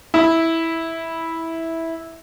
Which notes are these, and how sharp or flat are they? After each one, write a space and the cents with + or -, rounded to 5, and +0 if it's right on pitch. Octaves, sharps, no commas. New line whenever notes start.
E4 -10